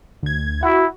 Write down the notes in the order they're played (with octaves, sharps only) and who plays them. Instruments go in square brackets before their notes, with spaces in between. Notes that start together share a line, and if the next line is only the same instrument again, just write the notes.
[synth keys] D2 G#6
[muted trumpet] E4 [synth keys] F#4